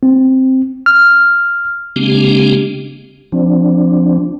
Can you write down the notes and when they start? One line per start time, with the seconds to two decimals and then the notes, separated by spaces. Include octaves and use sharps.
0.03 C4
0.86 F6
1.96 C#3 G#3 A#3 C4 D4 G4
3.32 F3 C4 D4